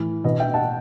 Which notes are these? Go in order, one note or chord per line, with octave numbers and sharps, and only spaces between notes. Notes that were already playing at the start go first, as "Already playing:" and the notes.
Already playing: A2 E3
B2 B4 D#5
E5 G5
F#5 A5